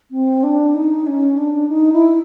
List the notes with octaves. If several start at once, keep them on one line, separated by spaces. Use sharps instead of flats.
C4
D4
D#4
C#4
D4
D#4
E4